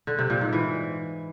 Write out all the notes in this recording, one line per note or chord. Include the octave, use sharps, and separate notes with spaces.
D3
C3
A#2
G#2
E3